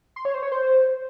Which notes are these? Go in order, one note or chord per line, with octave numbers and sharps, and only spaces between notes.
C6
C#5
C5
C#5
C5